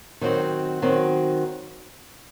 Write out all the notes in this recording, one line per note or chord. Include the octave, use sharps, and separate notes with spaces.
D#3 F#3 C4 F#4
D#3 F#3 C4 F#4